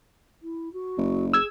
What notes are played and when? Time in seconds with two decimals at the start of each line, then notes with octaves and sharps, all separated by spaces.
0.42 E4
0.73 F#4
0.98 F#1
1.33 G#4 E6 G#6